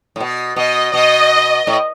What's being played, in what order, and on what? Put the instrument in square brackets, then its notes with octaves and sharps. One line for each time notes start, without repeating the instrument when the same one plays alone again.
[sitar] A2
B2
[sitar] B2 [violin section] D#5
[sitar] B2 [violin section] D#5
[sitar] A2